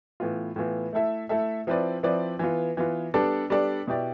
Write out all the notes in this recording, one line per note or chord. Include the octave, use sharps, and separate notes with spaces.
A2 E3 B3 F4
A2 E3 B3 F4
A3 E4 A4 E5
A3 E4 A4 E5
F3 C4 E4 B4 D5
F3 C4 E4 B4 D5
E3 B3 F4
E3 B3 F4
G3 B3 D4 A4 D5
G3 B3 D4 A4 D5
B2 B3 E4 G4 D5